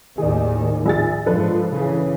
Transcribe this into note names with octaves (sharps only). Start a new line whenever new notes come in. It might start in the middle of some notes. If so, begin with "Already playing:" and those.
D#2 A2 D#3 G#4 D5
A#1 G#4 A6
G#2 F3 D4 A4 B4
C#3 E3